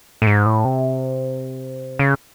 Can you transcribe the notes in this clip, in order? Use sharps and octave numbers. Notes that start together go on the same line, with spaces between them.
A2
G#2
A2
C3
C#3